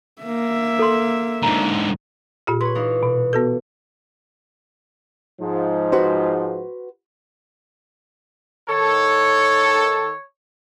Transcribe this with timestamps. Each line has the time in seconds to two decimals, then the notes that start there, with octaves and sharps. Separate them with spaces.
0.22 A#3 E5
0.79 A4 C6
1.43 G#2 D3 A#5
2.47 A#2 F4 G4
2.61 B4 C#5 C6
2.75 E3 D#4 F4
3.03 B2
3.33 B3 F#4 A4
5.41 G#2 F3
5.92 F#4 B4 C5
8.69 D#3 A4 C#5